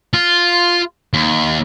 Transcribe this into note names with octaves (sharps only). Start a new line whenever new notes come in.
F4
D#2